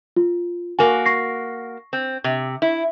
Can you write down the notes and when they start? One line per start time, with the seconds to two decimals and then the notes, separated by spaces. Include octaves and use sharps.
0.16 F4
0.79 A#3 F#4 G#5
1.06 C#6 A#6 C7
1.93 C4
2.24 C3
2.62 E4